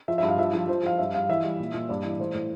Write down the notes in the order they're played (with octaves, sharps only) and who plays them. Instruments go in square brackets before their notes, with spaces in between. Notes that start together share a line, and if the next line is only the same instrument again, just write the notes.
[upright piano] F3 E5
E5
G2
F5
F3 E5
F3
F3 C5
F3 F5
G2 E5
G2 F5
E3 E5
G3
A#2
A#2
G2 D5
E3
A2 C5
A2